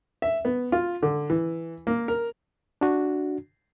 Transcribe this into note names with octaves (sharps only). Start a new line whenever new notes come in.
E5
B3
F4
D3
E3
A#3
A#4
D4 F#4